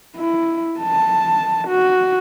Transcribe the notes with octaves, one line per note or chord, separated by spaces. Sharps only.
E4
A5
F#4